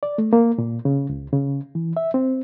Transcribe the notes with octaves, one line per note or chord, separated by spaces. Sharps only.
D5
A3
A#3
A#2
C#3
C#2
C#3
E3
E5
C4